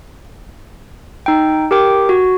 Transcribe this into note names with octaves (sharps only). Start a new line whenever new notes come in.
D#4 G5
G4 A#4 G5 D6
F#4